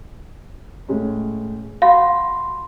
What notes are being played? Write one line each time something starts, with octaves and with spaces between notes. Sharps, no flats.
A2 G#3 C#4
F#4 F5 B5 C6